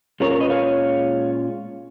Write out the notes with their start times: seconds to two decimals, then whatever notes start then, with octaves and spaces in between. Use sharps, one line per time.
0.20 A#2 G#3 C#4 F4 A#4 C#5
0.30 A#4 C#5
0.40 B4 D#5
0.50 C#5 F5